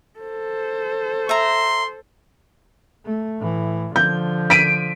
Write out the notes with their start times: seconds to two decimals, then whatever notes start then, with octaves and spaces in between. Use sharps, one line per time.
0.19 A4 C5
1.29 E5 A#5 C6
3.06 A3
3.39 A2 E3
3.96 D3 F3 G6
4.50 B6 D7 D#7